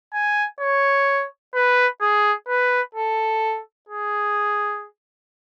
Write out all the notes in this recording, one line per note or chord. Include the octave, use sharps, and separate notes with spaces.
G#5
C#5
B4
G#4
B4
A4
G#4